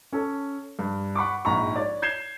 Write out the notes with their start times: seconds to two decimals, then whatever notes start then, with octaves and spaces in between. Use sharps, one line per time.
0.13 C#4 A4
0.79 G2
1.15 F#5 B5 C#6 D6
1.45 A#1 G#2 A#5 B5 C#6
1.76 C#5 D5
2.02 G6 G#6 C7 E7 G7